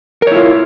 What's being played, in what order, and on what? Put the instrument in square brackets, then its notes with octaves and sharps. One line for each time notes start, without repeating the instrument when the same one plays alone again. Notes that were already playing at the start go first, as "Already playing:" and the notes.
[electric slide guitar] A#4
C#5
E4
F4